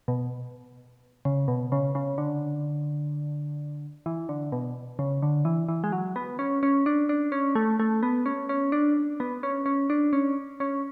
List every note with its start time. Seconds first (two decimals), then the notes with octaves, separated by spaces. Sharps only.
0.08 B2
1.25 C#3
1.48 B2
1.72 C#3
1.95 C#3
2.18 D3
4.06 E3
4.29 D3
4.52 B2
4.99 C#3
5.23 D3
5.45 E3
5.68 E3
5.84 G#3
5.92 F#3
6.16 B3
6.39 C#4
6.63 C#4
6.86 D4
7.09 D4
7.32 C#4
7.55 A3
7.80 A3
8.03 B3
8.26 C#4
8.49 C#4
8.72 D4
9.20 B3
9.43 C#4
9.66 C#4
9.90 D4
10.13 C#4
10.60 C#4